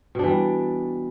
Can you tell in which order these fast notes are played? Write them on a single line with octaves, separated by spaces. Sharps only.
B2 D4 E3 G3